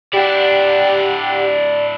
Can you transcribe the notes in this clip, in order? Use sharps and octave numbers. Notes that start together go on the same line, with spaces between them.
D4 E4 G4 D5 F#5